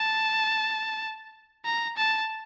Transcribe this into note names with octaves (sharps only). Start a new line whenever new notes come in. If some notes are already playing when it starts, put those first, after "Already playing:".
Already playing: A5
A#5
A5